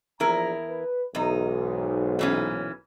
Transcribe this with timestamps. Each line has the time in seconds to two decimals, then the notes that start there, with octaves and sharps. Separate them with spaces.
0.20 A#1 E2 E4 A#4 A#5
0.68 B4
1.15 B1 E2 G#2 D#4
2.19 A#2 E3 C#4